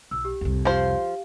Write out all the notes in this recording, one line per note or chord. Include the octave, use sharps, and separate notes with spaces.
B1 E6
G4
C2 F2
F3 G4 C5 F5